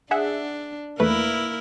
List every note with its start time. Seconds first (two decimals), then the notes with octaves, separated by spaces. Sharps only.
0.11 D4 G#4 E5 F#5
1.00 E2 A3 A#3 E4 A#4 B4